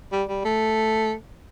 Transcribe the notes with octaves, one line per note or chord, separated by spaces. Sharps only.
G3
G3
A3